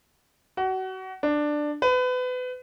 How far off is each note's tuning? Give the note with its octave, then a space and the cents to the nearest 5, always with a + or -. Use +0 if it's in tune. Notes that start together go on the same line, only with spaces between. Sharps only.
F#4 +30
D4 +10
B4 +30